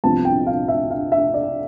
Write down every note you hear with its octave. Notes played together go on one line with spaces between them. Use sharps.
C2 C3 F3 B3 A5
G5
F5
E5
F5
E5
D5